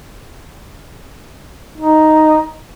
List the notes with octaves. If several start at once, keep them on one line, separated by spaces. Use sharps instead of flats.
D#4